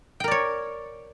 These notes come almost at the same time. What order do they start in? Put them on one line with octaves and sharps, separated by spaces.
G5 A#4 D5 C#5